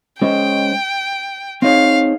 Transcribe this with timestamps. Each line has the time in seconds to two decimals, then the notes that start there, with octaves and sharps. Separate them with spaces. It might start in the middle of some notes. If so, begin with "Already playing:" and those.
0.21 G#3 C#4 G#4 C5 D#5 G5
1.62 C4 D#4 G#4 C#5 F5